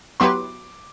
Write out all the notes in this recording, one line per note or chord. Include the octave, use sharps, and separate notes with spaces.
F#3 B3 E4 G4 B4 C6 D6